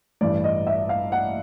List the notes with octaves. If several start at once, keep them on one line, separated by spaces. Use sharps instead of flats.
A1 G2 E3 D5
D#5
E5
F5
F#5